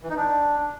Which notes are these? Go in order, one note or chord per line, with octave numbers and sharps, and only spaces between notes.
E3
D#4
D4